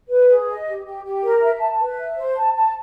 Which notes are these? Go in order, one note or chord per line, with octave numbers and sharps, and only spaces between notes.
B4
G#4
D#5
G4
G4
G4
A#4
E5
A5
B4
E5
C5
A5
A5